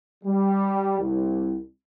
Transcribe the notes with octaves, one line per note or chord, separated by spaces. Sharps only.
G3
C2